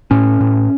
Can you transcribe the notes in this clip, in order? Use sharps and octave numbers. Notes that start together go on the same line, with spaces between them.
A2 C#4
A2